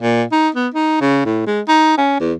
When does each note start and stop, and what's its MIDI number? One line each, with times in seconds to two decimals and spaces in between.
0.01 0.24 46
0.32 0.49 63
0.55 0.68 59
0.74 0.97 63
1.01 1.25 49
1.26 1.45 45
1.46 1.61 56
1.68 1.96 63
1.98 2.17 61
2.20 2.33 40